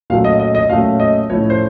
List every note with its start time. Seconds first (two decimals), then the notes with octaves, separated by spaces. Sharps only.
0.10 A#2 F#3 A3 C#4 F5
0.24 D#5
0.40 D#5
0.55 D#5
0.69 A#2 F#3 A3 C#4 F5
1.00 D#5
1.30 A2 F3 A3 C#4 C#5
1.50 C5